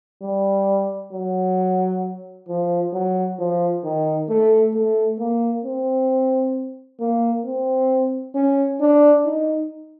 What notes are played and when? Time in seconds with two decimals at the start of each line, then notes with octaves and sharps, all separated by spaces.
0.23 G3
1.13 F#3
2.49 F3
2.94 F#3
3.39 F3
3.84 D#3
4.29 A3
4.74 A3
5.19 A#3
5.65 C4
7.00 A#3
7.45 C4
8.35 C#4
8.81 D4
9.26 D#4